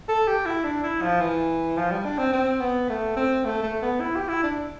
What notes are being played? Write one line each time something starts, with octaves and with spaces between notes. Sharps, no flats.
A4
G4
E4
D4
E4
F3
E3
F3
G3
D4
C4
C4
B3
A3
C4
A3
A3
B3
E4
G4
E4
D4